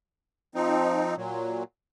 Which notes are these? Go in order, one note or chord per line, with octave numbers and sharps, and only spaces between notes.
F3 C4 D#4
A#2 F#3